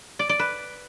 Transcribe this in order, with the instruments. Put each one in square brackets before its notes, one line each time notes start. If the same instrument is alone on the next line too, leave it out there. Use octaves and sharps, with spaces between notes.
[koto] D5
D5
B4